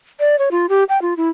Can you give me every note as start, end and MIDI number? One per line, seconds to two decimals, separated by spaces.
0.20 0.39 74
0.39 0.49 73
0.51 0.66 65
0.69 0.84 67
0.89 1.01 79
1.02 1.14 65
1.17 1.29 64